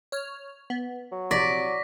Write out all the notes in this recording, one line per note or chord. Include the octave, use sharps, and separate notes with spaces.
C#5 F6
B3
F#3
A#1 C3 D5 C#6 A#6 B6